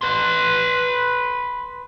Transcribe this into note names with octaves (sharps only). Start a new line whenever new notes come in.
B4 C6